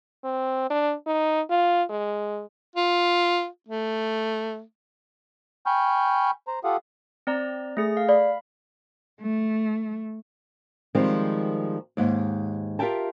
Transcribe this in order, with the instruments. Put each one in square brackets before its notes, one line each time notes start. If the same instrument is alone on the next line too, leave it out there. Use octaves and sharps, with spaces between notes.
[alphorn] C4
D4
D#4
F4
G#3
[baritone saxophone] F4
A3
[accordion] G5 G#5 B5 C#6 F6 G6
C5 A#5
F4 G4 A4 F5 F#5 D#6
[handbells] C4 D5 A#5
A3 G#4 A#6
F5
[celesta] D5 [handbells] B5
[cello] A3
[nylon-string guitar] D#3 F3 G3 G#3 C4
D#2 G#2
F4 G4 A#4 E5 G5 A5